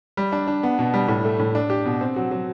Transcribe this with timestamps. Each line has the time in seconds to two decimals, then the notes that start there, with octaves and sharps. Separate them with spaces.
0.17 G3
0.32 D4
0.47 D4
0.63 B3
0.79 B2
0.94 G3
1.08 A2
1.25 A3
1.39 A2
1.55 D4
1.70 G4
1.85 B2
2.01 C4
2.16 F#3
2.31 F#3